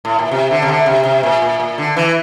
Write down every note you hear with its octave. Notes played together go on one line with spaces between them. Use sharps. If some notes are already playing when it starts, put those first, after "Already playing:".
A2
A#2
C3
D3
C3
D3
C3
C3
A#2
A#2
A#2
D3
E3